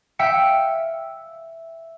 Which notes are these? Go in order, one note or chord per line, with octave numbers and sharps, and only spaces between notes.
E5 F5 G5 E6 B6 C#7